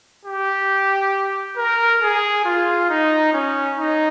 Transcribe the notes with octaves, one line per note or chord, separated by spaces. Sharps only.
G4
A#4
G#4
F4
D#4
C#4
D#4